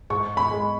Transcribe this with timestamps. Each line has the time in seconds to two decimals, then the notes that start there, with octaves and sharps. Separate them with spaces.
0.10 G#2 C#6
0.37 B5
0.51 G#3